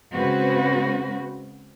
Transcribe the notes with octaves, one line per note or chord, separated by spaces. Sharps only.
C#3 G#3 C4 F#4 B4